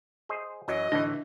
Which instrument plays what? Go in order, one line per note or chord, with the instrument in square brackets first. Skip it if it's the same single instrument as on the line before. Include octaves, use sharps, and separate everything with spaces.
[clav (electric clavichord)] G#4 C5 D#5
[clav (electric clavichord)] F#2 E3 F#3 [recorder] D#5
[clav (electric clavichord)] D2 A2 E3 [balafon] D4